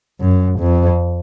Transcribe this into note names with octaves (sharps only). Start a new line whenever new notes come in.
F#2
F2